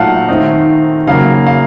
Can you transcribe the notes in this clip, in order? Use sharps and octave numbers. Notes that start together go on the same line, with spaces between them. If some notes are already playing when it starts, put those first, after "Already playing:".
Already playing: A#2 F#3 A3 D#4 F5 F#5 A5
D#3 A3 C4 D#4
C#3 F#3 A#3 F5
F5